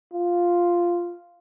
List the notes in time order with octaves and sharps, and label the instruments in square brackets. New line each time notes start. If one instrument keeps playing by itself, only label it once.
[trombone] F4